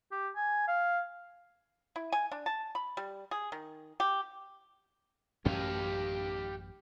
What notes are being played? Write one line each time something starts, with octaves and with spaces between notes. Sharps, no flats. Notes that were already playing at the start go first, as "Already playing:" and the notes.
G4
G#5
F5
E4
G#5
D4
A5
B5
G3
G#4
D#3
G4
A1 F#2 C#4 G4 F5